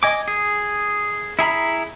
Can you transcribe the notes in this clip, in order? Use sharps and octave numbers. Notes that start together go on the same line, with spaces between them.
D#5 G#5 D6
G#4
E4 G#4 A#5 B5